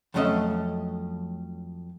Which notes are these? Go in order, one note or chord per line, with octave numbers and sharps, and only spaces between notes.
F2 F#3 A3 C#4 D#5 E5